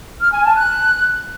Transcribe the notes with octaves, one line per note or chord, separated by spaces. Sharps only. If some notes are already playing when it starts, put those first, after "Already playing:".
F6
G#5
A5
F#6